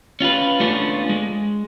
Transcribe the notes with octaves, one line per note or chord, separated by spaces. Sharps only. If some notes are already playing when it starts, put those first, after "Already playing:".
C#4 F4 G4 B4
A3 B3 C#4 D4 F4
G#3